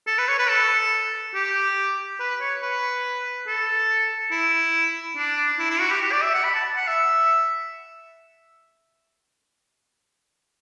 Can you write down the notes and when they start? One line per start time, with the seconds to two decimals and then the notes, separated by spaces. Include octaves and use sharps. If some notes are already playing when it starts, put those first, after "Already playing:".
0.07 A4
0.18 B4
0.29 C#5
0.39 B4
0.49 A4
1.34 G4
2.20 B4
2.41 C#5
2.62 B4
3.47 A4
4.31 E4
5.17 D4
5.59 E4
5.70 E4
5.80 F#4
5.91 G4
6.01 G4
6.12 D5
6.23 E5
6.34 F#5
6.44 B5
6.55 A5
6.77 F#5
6.87 E5